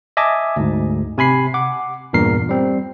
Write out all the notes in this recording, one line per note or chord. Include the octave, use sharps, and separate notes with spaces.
D#5 E5 G#5 A5 D6
D2 G#2
C3 G#5 B5 C7
F#5 D6
E2 G2 A#2 A#4 C7
G3 C4